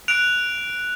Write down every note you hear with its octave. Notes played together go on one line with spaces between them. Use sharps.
F#6 D7 F7